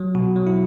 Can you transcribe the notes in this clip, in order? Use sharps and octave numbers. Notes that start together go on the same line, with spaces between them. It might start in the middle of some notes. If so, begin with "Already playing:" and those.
Already playing: F#3
B2 F#4
F#3
E4